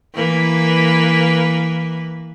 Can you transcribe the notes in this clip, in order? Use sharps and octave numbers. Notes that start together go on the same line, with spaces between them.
E3 A#3 B4